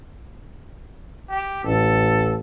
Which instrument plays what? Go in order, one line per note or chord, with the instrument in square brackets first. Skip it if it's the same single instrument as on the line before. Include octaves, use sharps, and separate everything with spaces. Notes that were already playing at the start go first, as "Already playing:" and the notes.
[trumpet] G4
[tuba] A1 [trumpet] A4